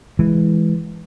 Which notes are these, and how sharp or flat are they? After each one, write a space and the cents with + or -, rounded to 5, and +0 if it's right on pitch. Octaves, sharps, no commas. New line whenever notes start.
E3 +0 G#3 +0